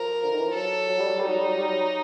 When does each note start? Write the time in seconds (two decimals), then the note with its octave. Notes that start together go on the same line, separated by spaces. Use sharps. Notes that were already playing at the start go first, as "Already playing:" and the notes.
Already playing: F3 A#4
0.24 D3
0.31 D#3
0.39 E3
0.47 F3
0.54 F#3 A4
0.89 F#3
0.99 G3
1.09 F#3
1.19 G3
1.24 F#3 D#4
1.38 G3
1.48 F#3
1.58 G3
1.68 F#3